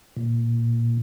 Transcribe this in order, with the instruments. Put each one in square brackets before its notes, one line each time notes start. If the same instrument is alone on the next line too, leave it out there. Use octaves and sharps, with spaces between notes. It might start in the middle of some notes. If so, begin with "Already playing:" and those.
[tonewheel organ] A#2